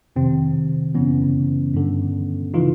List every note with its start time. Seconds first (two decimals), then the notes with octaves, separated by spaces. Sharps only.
0.16 F2 C3 D#3 C4
0.95 F#2 C#3 E3 B3 C#4
1.74 G2 D3
2.54 C#3 E3 D#4 F4